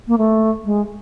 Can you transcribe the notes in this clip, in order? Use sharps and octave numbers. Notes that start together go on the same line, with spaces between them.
A#3
A3
G#3